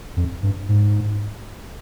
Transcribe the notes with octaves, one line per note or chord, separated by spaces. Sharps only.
F2
G2
G#2